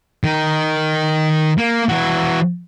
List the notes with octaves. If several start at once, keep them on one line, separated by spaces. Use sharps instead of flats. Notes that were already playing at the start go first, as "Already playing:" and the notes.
D#3
A#3
E3 F#4